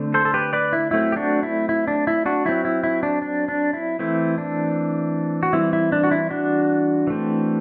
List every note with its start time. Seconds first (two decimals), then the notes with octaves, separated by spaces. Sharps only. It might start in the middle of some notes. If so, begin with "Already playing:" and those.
Already playing: D3 A3 C4
0.14 A4 C5
0.25 A4
0.34 G4 B4
0.53 B4 D5
0.73 E4
0.91 F#3 A3 C4 E4
1.12 G4
1.16 D4 F#4
1.43 E4
1.69 E4
1.88 D4
2.07 E4
2.26 D4 F#4
2.45 F#3 C4 E4
2.65 E4
2.84 E4
3.03 D4
3.22 D4
3.48 D4
3.73 E4
3.99 E3 A3 C4 E4
4.38 D4
5.43 F#4
5.53 E3 G3 C4 E4
5.73 E4
5.92 D4
6.04 F#4
6.11 E4
6.30 D4 F#4
7.07 E3 A3 C4